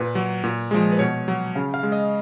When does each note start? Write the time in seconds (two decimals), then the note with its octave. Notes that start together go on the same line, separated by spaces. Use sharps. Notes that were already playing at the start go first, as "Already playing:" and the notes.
Already playing: A#2 B4
0.15 F#3
0.44 A#2
0.71 F3 G#3
0.92 B4
0.99 B2 C#5
1.28 F#3
1.55 C#3 F5
1.74 F5
1.83 G#3
1.92 D#5